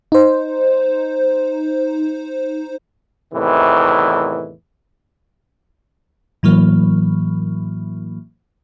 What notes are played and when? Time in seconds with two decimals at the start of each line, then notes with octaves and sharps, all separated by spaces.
0.12 D#4 C5
3.34 E2 A2 C3 D#3 E3
6.43 A2 E3 F#3 A#3